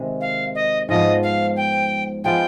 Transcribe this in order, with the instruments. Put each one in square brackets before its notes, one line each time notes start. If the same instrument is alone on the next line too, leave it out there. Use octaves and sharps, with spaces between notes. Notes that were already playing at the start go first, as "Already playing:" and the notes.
Already playing: [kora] C3 D#3 G#3
[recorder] F5
D#5
[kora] G#2 F3 B3 [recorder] D#5
[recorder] F5
G5
[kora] F3 G#3 B3 F4 [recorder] G5